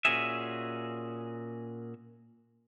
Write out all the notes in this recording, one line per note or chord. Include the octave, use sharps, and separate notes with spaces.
A#2 C#4 F#4 G#4 E5